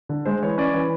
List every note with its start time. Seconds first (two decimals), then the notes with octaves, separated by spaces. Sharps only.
0.09 D3
0.26 G#3 C5
0.43 E3 C#5
0.58 C#4 D5
0.74 E3